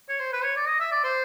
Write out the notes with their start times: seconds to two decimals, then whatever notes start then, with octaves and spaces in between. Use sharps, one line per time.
0.09 C#5
0.20 C5
0.33 B4
0.44 C#5
0.56 D5
0.67 D#5
0.80 E5
0.92 D5
1.04 C5